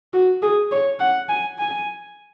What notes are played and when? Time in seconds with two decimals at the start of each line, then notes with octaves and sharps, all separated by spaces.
0.13 F#4
0.42 G#4
0.71 C#5
1.00 F#5
1.29 G#5
1.58 G#5